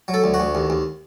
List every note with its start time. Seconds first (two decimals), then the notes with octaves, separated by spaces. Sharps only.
0.08 F#3
0.14 A4
0.24 D2
0.34 F#4
0.40 D2
0.55 D#2
0.70 D#2